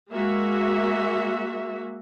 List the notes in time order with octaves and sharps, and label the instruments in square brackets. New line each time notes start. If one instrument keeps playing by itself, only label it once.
[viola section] G#3 A#3 F#4 E5